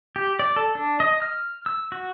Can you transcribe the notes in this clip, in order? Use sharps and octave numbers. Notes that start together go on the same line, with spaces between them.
G4
D5
A4
D4
D#5
F6
E6
F#4